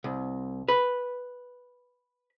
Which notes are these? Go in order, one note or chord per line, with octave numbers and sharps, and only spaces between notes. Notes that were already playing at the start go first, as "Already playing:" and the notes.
C2
B4